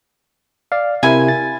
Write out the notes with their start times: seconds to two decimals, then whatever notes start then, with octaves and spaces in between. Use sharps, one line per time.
0.72 D5 F5
1.03 C3 E4 A#4 G#5
1.28 A6